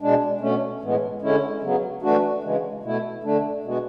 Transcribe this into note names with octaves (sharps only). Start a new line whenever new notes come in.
B2 G#3 D4
B2 A3 C#4
A2 E3 G#3 B3
D3 G#3 C#4 E4
C#3 F#3 B3
E3 A3 D4 F#4
C#3 E3 G#3
B2 A3 E4
D3 A3 D4
B2 G#3 B3 F#4